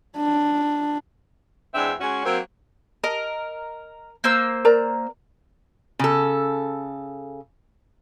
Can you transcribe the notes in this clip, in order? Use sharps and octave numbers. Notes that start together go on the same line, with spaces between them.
D4
E2 G#3 C4 D4 E5
G#3 C#4 F#4
F#3 A#3 C4
A#4 D#5
A#3 C5 E6
A#4 D5 A#5
C#3 A4